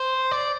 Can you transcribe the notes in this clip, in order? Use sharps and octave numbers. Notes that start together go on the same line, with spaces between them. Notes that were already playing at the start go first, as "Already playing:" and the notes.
Already playing: C5
D5